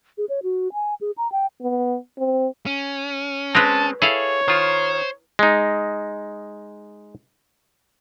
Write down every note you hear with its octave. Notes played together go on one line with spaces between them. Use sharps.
G#4
C#5
F#4
G#5
G#4
A#5
G5
B3
C4
C#4
G#3 C4 A#4 B4 A5
E4 G#4 A4 C#5 F5
D#3 F4 C5
G#3 D#4